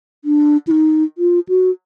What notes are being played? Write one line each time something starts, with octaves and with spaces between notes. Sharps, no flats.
D4
E4
D#4
F4
F#4